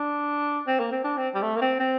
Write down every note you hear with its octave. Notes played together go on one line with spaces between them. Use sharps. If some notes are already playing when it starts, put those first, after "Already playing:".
Already playing: D4
C4
A#3
C4
D4
C4
G3
A3
A#3
C4
C4